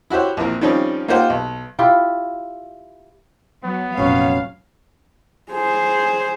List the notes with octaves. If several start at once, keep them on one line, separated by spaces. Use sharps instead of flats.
E4 F#4 G4 C5 C#5
A#1 E3 C4 A#4
D#3 F3 G3 C4 C#4 D#4
A#3 D#4 F4 G4 C5 F#5
B1
E4 F4 G4 G5
F#3 B3
F1 A#2 F#3 C#4 F5
G#4 C5